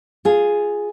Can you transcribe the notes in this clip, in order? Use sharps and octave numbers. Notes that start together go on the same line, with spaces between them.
F4 G#4